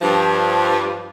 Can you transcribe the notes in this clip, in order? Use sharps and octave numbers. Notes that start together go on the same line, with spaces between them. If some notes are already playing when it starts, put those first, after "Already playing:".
G2 F3